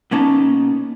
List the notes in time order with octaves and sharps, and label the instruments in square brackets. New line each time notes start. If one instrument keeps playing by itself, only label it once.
[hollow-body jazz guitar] B2 A#3 C#4 D#4 A5